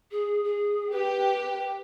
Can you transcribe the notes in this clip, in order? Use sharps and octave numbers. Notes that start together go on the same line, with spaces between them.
G#4
G#4
G4 B4